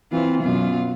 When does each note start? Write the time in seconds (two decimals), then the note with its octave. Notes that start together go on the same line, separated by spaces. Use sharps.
0.12 E3 C4 F4
0.42 F#2 B2 F4